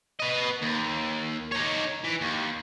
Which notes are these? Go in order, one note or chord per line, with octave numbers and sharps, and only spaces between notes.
B4 D#5
D#2
D#4 C#5
E3
D#2